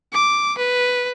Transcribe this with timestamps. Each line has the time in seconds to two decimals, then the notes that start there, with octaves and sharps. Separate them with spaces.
0.13 D6
0.58 B4